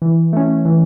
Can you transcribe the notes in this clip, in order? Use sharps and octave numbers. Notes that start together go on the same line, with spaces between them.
E3
A3 C#4
E3